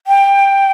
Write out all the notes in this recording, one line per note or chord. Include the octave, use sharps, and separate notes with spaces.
G5